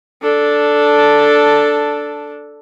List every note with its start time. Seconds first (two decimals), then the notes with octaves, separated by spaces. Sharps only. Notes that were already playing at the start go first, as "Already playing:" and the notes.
0.23 D4 A4